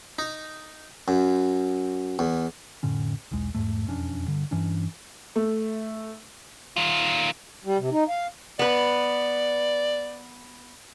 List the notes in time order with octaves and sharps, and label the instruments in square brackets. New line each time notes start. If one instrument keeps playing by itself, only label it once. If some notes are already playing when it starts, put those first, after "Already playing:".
[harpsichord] D#4
F#2
E2
[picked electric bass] F1 A2 D3 C#4
B1 E2 G#3
E2 G#2 A3
E1 F2 C#4 D4
G2 D3
G2 E3 C#4 D4
[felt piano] A3
[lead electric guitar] D#3 F4
[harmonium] G3
C3
D#4
F5
[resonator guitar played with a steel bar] B3 B4 [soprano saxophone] D5